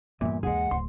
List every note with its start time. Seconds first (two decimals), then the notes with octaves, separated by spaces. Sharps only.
0.21 E2 G2 A#2 E5
0.43 D#2 E3 G#3 G#4 F#5
0.71 D1 D2 C6